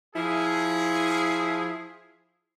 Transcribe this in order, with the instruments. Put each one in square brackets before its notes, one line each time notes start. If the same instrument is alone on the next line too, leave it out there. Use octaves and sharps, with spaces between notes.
[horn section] F3 E4 G#4